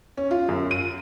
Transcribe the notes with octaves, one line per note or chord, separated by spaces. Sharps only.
C#4
F4
F#2
D#7